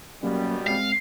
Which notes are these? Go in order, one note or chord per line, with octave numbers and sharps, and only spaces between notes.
F#2 B2 F#3 G3 A#3 C#4
G#3 C4 F5